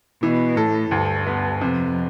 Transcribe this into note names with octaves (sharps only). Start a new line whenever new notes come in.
B2 E3
A2 A4
D2 G2
B3
F2 C3